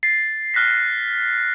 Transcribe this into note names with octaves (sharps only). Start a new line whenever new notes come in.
A6 C7
F6 F#6 A#6 B6